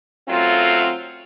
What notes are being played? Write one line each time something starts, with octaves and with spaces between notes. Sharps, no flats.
F#2 F#3 A3 C4 F4